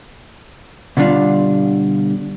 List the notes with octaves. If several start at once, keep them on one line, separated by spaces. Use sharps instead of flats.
B2 D3 G3 D4 F4